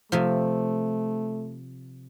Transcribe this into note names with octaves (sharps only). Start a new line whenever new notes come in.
C3 F3 A3